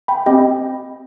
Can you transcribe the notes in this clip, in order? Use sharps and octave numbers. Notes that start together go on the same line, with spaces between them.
G5 B5
C4 G4 D#5 G5